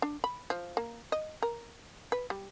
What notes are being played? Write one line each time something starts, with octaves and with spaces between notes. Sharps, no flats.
D4
B5
F3
A#3
D#5
A#4
B4
G3